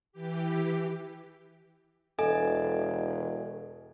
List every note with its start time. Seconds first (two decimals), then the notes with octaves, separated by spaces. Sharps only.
0.12 E3 G4
2.19 E1 A4 D#5 G#5